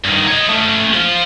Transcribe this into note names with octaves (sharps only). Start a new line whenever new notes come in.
G2 D#3
C#5 D#5
A3 C#4
F3 F4